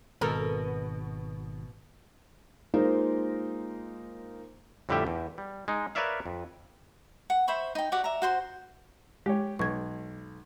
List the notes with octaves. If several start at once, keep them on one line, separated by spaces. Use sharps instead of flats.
G#1 B2 A4 A#4 F6
G#3 A#3 D#4 F4 A#4 C5
F2 A2 D3 G3 G4 E5
E2
G3
G#3 D#4
A#4 B4 C#5 D5 E5 F5
F2
F#5
C5 E5 B5 C#6
D#4 G5
F#4 G4 D5 F#5
E5 A#5
F#4 C5 C6
G#3 G4 C#5
B1 C#6 G#6